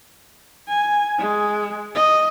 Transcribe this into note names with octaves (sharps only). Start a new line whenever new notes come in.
G#5
G#3
D#5